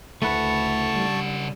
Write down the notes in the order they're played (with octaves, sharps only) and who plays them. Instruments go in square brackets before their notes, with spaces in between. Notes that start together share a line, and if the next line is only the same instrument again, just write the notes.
[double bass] D2 [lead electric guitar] C#3 F#5 [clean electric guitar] A3 E4 B4 [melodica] A5 C#6
[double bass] G3 D4